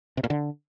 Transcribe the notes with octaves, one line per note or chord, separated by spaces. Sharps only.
C3
A#2
D3